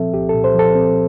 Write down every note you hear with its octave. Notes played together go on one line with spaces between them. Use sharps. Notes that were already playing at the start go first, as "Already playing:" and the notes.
Already playing: A#2 F3 C4 A4 E5
C2 G4
A#2 A4
C5
F3 A4
C4